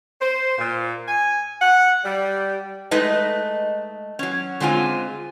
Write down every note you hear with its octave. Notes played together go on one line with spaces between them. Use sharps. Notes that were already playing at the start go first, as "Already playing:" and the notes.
C5
A#2
G#5
F#5
G3
G#3 A3 D#4 B4 D#5
F#3 C#4
D3 G#3 C4 F4 G#5